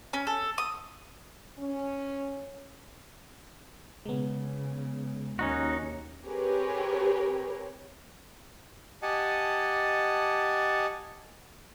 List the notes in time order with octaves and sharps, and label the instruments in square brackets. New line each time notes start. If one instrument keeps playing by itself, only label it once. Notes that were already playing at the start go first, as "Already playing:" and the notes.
[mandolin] C#4
A4
D#6
[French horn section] C#4
[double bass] C#3 [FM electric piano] G#3 B3
[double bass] D#2 [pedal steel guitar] C#4 D#4 F#4
[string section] C4 G4 G#4 A#4 B4 C#5
[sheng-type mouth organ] G4 D#5 F#5 G#5 A5